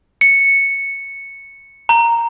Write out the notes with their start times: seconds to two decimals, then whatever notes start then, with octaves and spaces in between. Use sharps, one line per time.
0.21 C#7
1.89 A#5